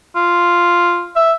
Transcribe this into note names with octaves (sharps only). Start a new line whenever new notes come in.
F4
E5